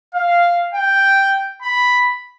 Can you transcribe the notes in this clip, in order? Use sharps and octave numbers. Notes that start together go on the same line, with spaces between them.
F5
G5
B5